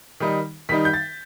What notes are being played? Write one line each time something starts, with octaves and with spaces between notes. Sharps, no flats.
D#3 G3 D#4
D#3 G3 D#4 B6
G6
A6